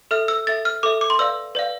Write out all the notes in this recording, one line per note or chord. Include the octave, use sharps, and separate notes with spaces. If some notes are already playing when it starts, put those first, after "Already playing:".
A4 E5 F6
E6
A4 E5 A6
F6
A4 E5 D6
D6
C6
B4 D5 F5 E6
B4 D5 F5